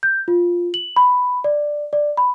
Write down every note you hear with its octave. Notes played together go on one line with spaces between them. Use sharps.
G6
F4
F#7
B5
D5
D5
B5